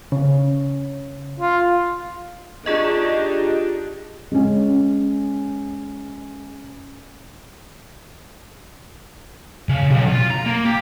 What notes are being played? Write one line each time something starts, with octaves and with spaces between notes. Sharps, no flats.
C#3
F4
D4 D#4 F4 G4 G#4 D#5
G#3 C#4
C#3
B1
F4
A#5
A#3
G4